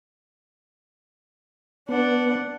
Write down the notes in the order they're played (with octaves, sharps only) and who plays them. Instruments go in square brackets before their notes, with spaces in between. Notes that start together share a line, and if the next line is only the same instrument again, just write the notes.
[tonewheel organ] B3 [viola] D4 F#5